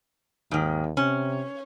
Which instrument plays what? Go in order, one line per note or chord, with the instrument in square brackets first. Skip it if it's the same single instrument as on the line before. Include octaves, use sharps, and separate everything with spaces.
[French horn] D#2 [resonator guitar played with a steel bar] G#2 D#3
[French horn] C3 [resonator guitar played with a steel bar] C#4